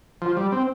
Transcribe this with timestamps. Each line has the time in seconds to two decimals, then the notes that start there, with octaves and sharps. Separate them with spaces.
0.22 F3
0.37 G3
0.52 C4